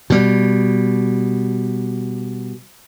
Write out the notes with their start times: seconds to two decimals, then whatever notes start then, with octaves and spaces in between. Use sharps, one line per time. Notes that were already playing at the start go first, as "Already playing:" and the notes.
0.10 B2 G3